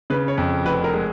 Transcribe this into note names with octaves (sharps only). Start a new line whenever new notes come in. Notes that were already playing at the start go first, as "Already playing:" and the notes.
C#3 B4
C#5
F2
F1 B4
A#4
G#3